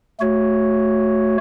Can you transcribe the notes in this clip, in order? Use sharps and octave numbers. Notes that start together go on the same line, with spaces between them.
A3 F#4 C#5